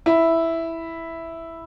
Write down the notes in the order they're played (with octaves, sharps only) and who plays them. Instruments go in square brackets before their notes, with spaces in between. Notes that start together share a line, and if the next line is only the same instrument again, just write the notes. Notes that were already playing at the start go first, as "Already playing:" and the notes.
[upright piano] E4